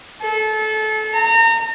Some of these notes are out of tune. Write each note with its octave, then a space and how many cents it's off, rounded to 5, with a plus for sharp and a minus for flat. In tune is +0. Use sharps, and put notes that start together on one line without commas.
A4 -25
A#5 -35